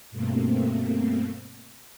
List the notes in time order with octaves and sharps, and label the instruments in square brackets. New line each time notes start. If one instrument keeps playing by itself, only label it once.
[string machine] G2 B2 A3 A#3 C4